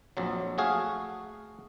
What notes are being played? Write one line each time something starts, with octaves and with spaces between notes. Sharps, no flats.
A#1 F2 F#3
A3 F#4 G#4 F5